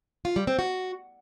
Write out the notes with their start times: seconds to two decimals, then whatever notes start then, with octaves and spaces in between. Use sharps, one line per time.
0.25 F4
0.36 G3
0.47 C4
0.59 F#4